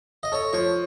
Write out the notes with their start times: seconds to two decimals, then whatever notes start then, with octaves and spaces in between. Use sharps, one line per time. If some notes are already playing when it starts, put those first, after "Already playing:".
0.23 D#5
0.32 A4 C#5
0.53 F3 C#5